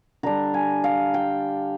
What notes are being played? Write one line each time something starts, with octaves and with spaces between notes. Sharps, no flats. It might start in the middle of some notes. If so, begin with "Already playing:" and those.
D3 G3 D4 A#5
G#5
F5
G5